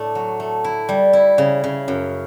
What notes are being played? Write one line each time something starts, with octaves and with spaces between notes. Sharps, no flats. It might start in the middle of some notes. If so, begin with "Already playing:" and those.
Already playing: A2 A3 D4
F#3
A3
E4
G3
E4
C#3
C#3
F#2